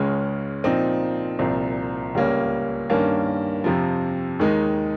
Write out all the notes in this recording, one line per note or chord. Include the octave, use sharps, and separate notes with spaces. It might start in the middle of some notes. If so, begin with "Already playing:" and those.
Already playing: C#2 C#3 G#3 C#4
A#2 F3 C4 D#4
C2 A#2 F3 C4
C#2 C#3 G3 A#3 C#4
G2 D#3 A#3 C#4
F2 C3 F3
D#2 D#3 G#3 D#4